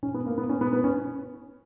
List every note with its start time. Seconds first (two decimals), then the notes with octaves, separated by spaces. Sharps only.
0.03 C#4
0.14 B3
0.26 A#3
0.38 B3
0.49 C#4
0.61 B3
0.73 B3
0.84 C#4